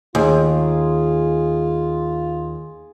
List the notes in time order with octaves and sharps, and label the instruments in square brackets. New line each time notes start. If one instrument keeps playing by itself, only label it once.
[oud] D#2 [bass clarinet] F4 [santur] G#4